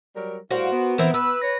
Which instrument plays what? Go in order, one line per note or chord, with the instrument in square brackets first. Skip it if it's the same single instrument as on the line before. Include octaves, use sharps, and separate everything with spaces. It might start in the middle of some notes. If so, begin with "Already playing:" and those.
[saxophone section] F#3 G3 A#4
[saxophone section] A2 G3 F5 [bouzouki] F#4 A#4 C5
[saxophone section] B3
[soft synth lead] E3 [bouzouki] C4 E4 A#4
[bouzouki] B4 [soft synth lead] E6
[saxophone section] C#5 [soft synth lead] A#6